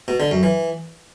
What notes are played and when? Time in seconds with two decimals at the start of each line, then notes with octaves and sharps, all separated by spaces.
0.08 B2
0.20 D3
0.31 F#2
0.43 E3